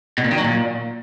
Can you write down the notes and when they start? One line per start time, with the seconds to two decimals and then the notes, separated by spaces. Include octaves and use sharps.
0.18 B2
0.24 A#2
0.31 D#3
0.38 F#3
0.45 A#2